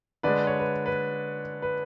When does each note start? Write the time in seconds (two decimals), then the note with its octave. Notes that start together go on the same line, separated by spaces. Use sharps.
0.23 D3 G#3 B4 D5
0.47 C#5
0.59 B4
0.86 B4
1.62 B4